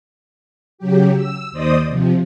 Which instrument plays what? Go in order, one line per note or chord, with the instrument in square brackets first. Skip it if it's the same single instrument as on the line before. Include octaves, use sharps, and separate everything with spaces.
[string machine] C#3 F#3 G4
E6
D#2 C5 D5 D#5 D#6
C3 F3